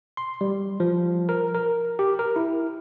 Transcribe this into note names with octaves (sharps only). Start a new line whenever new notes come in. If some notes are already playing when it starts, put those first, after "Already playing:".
C6
G3
F3
A#4
A#4
G4
A#4
E4